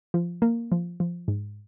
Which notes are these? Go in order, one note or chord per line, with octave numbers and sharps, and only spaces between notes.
F3
A#3
F3
F3
G#2